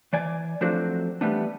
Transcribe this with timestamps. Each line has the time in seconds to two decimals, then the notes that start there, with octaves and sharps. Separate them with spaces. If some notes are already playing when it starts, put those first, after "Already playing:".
0.13 E3 D5 G#5
0.61 F3 F#3 A3 C4 D4 F#4
1.21 E3 G3 A3 B3 D4